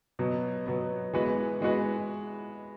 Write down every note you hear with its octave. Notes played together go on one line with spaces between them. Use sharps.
B2 F#3 B3
B2 F#3 B3
E3 G#3 B3 F#4 B4
E3 G#3 B3 F#4 B4